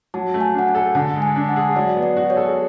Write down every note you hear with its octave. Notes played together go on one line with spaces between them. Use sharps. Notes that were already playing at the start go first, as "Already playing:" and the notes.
F#3 A5
A3
G#5
D4 F#5
G#5
A4
D3 A5
G#3
G#5
D4
F#5
G#4
F#3 D5
B3
D5
F#4
C#5
A4
G#4